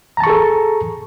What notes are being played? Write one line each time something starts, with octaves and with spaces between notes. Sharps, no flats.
G#4 A4 A5 A#5 C#6